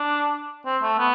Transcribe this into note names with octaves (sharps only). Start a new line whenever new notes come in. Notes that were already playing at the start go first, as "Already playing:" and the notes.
Already playing: D4
C4
A3
B3